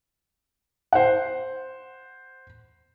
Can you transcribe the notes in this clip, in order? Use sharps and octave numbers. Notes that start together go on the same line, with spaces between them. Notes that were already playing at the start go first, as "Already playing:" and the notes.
C5 F#5